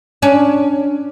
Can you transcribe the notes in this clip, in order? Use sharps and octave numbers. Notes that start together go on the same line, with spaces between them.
C#4 D4